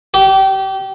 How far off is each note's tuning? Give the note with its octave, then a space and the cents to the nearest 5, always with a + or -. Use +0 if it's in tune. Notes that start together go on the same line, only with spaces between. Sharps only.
G4 -25